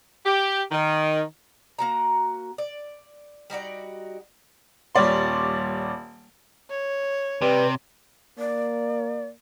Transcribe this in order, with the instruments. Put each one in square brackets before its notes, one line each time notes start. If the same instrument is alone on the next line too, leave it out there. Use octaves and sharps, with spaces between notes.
[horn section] G4
D#3
[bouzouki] A#3 F#4 A#5
D5
G3 D#4 F#4 D5
[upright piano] D#1 G3 C#5 D5 C6
[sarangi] C#5
[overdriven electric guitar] C3 [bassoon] G3 [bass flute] B4
[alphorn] A#3 [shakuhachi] D5